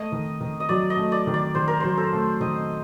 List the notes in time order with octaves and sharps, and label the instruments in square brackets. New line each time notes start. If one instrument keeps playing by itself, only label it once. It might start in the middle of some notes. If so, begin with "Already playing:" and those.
Already playing: [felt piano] A3 [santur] D#5
[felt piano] D#3
D#3
[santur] D#5
[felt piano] F#3 [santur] D5
[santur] D#5
[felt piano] A3
[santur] D5
[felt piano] D#3
[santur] D5
[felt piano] D#3 [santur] C5
[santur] A#4
[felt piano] F#3 [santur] C5
[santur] A4
[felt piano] A3
[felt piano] D#3 [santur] D#5